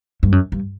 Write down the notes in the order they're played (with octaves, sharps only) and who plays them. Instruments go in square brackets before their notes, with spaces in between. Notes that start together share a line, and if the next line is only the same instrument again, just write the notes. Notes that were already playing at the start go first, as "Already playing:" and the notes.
[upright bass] G2
F#2
G2